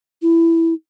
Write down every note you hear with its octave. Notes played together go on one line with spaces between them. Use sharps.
E4